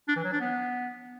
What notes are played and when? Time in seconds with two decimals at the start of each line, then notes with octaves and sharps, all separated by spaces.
0.08 D4
0.16 E3
0.24 F#3
0.32 D4
0.40 B3